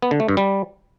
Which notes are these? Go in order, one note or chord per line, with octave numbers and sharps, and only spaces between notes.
B3
D3
A3
G2
G3